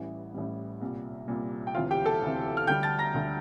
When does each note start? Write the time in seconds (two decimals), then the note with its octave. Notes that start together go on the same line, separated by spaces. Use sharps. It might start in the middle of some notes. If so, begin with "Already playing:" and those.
Already playing: A1 A2 E3 G3
0.34 A1 A2 E3 G3
0.81 C2 A#2 G3
1.28 C2 A#2 G3
1.67 G5
1.74 E1 D2 C3 E3 F4 F5
1.91 G4 G5
2.05 A4 A5
2.21 E1 D2 C3 E3
2.57 F6
2.67 D2 D3 G3 G5 G6
2.83 A5 A6
2.99 A#5 A#6
3.14 D2 D3 G3